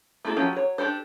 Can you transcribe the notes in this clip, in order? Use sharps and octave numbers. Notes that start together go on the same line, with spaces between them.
A3 A#3 E4 G#4 A4
F3 F#3 C#4 G4 A#4
F#3 C#5
D4 G4 A4 C5